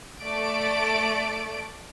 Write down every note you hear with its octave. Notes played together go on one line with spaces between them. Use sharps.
A3 D5 D7